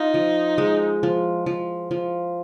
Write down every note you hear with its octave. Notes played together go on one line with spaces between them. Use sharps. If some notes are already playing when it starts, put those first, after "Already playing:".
Already playing: D#4 F4
F3
G#3
F3
F3
F3